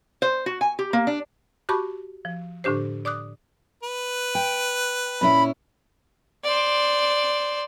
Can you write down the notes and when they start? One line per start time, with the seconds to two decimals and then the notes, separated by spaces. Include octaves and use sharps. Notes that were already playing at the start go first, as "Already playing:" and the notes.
0.22 C5
0.46 F#4
0.61 G#5
0.79 G4
0.93 A#3
1.07 D4
1.69 F#4 G4 A5 B5 C#6 D6
2.25 F3
2.64 A2 D3 D4 G4 C5
3.05 D5 D6 D#6 F#6
3.83 B4
4.35 G5
5.21 A#2 C#4 E4 B5
6.44 C5 D5